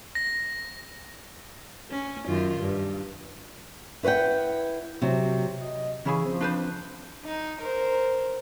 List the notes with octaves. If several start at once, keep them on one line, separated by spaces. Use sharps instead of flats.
A#6
C#4
F#2 D#3 F4
G2
E4 B4 C5 F#5 G5
C3 F#3
D#5
C#3 E3 C#4 E4 G#4
F3 C4
D4 B4 C5
D#4
A#4 C5